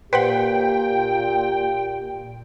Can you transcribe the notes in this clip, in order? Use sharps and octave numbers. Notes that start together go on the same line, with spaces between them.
A#2 G4 B4 C5 F#5 G5